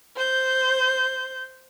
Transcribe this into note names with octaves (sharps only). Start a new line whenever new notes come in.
C5 G6